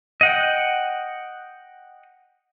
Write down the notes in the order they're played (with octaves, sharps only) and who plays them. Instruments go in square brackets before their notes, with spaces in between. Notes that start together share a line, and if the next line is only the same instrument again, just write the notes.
[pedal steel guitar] D#5 F#5 G5